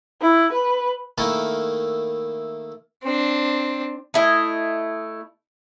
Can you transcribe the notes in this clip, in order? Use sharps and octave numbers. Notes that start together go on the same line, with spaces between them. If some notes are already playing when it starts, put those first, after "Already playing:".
E4
B4
D#3 A3 A#3 E4 A4 A#4
C4 D4
A3 E4 D#5